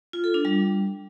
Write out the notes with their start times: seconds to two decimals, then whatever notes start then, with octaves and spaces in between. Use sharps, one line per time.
0.13 F4
0.24 A4
0.34 D4
0.45 G3